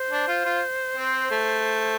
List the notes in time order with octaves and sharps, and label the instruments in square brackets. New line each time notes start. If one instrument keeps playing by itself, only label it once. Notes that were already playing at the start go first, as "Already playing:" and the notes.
Already playing: [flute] C5
[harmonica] D4
F4
F4
C4
A3